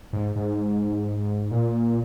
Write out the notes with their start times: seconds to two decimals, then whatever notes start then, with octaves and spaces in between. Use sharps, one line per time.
0.13 G#2
0.36 G#2
1.51 A#2